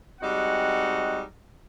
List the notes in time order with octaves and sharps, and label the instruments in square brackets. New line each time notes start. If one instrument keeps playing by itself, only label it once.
[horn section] G3 G#3 C4 D#4 F#4 F#5